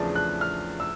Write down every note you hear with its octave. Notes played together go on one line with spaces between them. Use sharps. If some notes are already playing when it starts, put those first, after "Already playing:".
Already playing: E2 C#3 F3 A3 D4
F#6
F6
E6